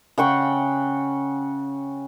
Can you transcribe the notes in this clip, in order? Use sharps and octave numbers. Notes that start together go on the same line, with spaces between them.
C#3 F#5 G5 C#6